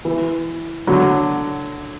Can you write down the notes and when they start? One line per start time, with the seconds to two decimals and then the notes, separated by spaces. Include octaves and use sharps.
0.05 E3
0.87 D3 F#3